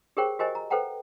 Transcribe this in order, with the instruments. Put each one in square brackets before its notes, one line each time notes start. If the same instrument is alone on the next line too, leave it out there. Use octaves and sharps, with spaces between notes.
[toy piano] G4 G#4 A#4 C5 C#5 G5
F#4 G4 A#4 C5 D#5 G#5
A#5
A4 B4 C5 F#5 G5 A#5